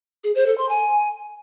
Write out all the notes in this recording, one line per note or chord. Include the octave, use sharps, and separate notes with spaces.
G#4
C5
A4
C6
G#5